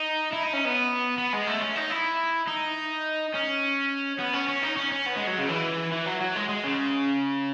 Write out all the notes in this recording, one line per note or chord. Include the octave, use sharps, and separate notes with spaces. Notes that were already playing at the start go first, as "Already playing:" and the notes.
Already playing: D#4
E4
D#4
C#4
B3
B3
G#3
A3
C#4
D#4
E4
D#4
C#4
B3
C#4
C#4
D#4
C#4
C#4
B3
G#3
F#3
C#3
E3
E3
F#3
F#3
G#3
G#3
C#3